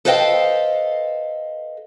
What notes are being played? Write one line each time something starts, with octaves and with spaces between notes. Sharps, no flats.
A4 B4 C5 D#5 F5 G5